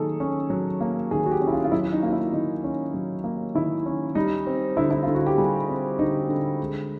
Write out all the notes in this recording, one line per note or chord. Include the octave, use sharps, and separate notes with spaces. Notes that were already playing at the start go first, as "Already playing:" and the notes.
Already playing: D#3 F#3 A#3 G#4 A4
C#4
F#3
A#3
D#3 G#4
F#4
G4
C#4
E4
F4
F4
F#3 E4
D#4
A#3 F4
E4
D#3 D#4
C#4
F#3
A#3
D#3 E4
C#4
G3 D#4
C4
D3 E4
E4
D3 F4
F#4
G4
G3 G#4
C4
D3 D#4
D3
G#3